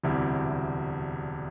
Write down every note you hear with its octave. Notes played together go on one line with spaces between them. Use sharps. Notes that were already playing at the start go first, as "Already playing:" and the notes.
E1 D2 C3 G3 E4